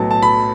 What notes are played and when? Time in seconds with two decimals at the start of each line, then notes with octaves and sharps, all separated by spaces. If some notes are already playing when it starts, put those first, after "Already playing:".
Already playing: B1 A2 F#3 B3 A5
0.11 A5
0.22 B5